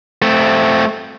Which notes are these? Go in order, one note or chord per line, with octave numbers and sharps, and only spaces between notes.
A3 C4